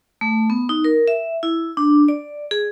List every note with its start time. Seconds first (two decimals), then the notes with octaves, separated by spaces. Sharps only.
0.21 A3
0.50 B3
0.69 D#4
0.84 A#4
1.08 E5
1.43 E4
1.77 D4
2.08 D5
2.51 G#4